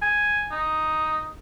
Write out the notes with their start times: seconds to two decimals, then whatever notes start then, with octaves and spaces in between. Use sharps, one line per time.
0.02 G#5
0.51 D#4